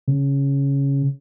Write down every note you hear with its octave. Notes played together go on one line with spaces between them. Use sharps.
C#3